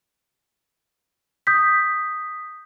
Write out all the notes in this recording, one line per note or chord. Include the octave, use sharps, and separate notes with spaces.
D#6 G6 B6